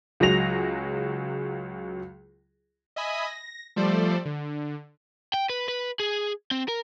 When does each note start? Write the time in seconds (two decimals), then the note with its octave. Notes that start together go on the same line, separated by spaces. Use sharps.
0.20 C#2 F#3 F#4 G#4 A#6 F7
2.96 D#5 E5 G#5 B5 D#6
3.26 A#6
3.76 F3 G3 A3 A4 C5 D5
4.25 D3
5.34 G5
5.50 B4
5.68 B4
6.00 G#4
6.51 C4
6.68 A#4